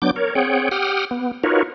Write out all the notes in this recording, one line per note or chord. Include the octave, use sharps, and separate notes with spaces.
F#3 B3 D4 D6 G6
A#4 C#5
C4 G#4 C#5 F#5 G5
G4 F#5 G5 D#6 F6
B3
D#4 F4 F#4 A#4 B4 C#5